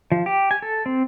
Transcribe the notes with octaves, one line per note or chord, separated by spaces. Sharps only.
F3
G4
G#5
A4
C4